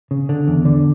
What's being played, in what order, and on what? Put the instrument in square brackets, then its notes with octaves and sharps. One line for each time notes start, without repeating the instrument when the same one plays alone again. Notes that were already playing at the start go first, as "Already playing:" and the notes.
[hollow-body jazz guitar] C#3
D3
E2
D3